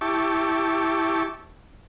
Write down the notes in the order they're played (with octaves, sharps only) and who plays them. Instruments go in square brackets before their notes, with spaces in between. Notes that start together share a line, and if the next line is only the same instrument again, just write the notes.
[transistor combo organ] E4 G4 A5 C#6 D6